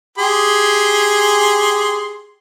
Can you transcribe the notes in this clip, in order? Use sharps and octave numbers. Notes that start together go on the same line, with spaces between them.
G4 G#4 C6